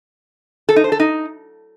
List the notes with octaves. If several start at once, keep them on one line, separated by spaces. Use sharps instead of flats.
A4
D#4
C5
A4
D#4